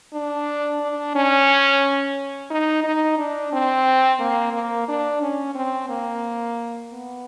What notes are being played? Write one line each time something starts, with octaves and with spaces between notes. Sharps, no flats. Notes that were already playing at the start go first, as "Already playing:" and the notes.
D4
D4
C#4
D#4
D#4
D4
C4
A#3
A#3
D4
C#4
C4
A#3
B3